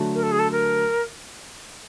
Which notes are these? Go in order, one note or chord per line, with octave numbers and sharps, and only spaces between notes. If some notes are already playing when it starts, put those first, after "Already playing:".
Already playing: D3 F#3 A3
A#4
A4
G#4
A4
A#4